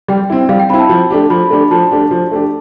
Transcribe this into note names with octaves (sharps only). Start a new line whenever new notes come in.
G3 G5
C4 E4
G5
G3 F5
G5
C4 E4 B5
A5
F3
A3 D4 G4
F3 B5
A3 D4 G4
F3 A5
A3 D4 G4
F3
A3 D4 G4